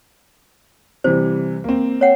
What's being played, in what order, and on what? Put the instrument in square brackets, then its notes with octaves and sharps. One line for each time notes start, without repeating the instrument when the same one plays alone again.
[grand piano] C3 E3 G3 [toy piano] C5
[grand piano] A#3 C4
[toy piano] C#5 F#5 G5